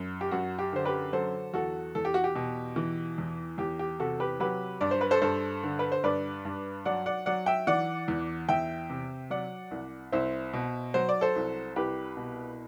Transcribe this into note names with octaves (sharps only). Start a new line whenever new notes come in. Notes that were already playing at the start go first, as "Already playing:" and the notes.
Already playing: F#2
G4
F#2 F#4
G4
D3 C5
G4 B4
F#3 A4 C5
E2 F#4 A4
E2 A4
G4
F#4
G4
B2
E3
E2
E2 G4
G4
C3 F#4 A4
G4 B4
F#3 G4 B4
G2 D5
C5
B4
A4 C5
G2 A4 C5
D3
B4
C5
G2 B4 D5
G2
F#3 D5 F#5
D5 F#5
F#3 D5 F#5
E5 G5
E3 D5 F#5
E2
E2 E5 G5
C3
F#3 D5 F#5
C2
C2 C5 E5
B2
F#3 C5
D5
A4 C5
C2
C2 G4 B4
B2